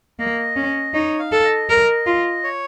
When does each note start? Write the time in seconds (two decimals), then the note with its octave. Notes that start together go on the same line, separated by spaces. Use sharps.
0.19 A#3 D#5
0.56 C#4
0.94 D#4 C#5
1.19 F5
1.32 A4
1.44 D#5
1.69 A#4
2.06 F4
2.44 C#5